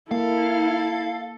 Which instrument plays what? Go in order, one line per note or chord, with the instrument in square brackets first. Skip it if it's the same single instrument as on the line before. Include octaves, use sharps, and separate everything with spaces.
[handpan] A#3 [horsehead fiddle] E4 [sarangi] A4 [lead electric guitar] F5